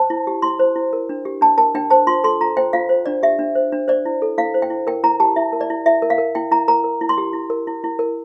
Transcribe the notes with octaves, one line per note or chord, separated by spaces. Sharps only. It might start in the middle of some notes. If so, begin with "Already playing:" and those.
Already playing: C5 A5
E4
G4
E4 C6
C5
E4
A#4
D4
G4
D4 A5
A#4 A5
D4 G5
C5 A5
F4 C6
A4 C6
F4 A#5
C5 G5
F4 F5
C5
D4 D5
G4 E5
D4
C5
D4
C5 D5
E4
A4
E4 F5
C5
G5
E4
A#4 G5
E4 A#5
G4 A5
E4 E5
A#4
D5
E4
E4 E5
A#4
F5
A#4
E4 G5
E4 A#5
A#4 A#5
A#4
E4
C6
G4
E4
A#4
E4
E4
A#4